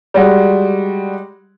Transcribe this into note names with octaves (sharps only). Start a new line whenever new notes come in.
G3 G#3 F#4